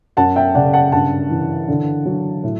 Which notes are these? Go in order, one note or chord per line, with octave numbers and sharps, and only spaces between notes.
F#2 F#5 A5
E5 G5
C#3 D5 F#5
F#5 A5
G2 F#5 A5
E3
D3
F#3
A2